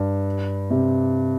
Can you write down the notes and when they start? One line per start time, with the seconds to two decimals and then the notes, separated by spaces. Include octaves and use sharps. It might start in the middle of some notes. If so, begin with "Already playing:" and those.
Already playing: G2
0.71 C3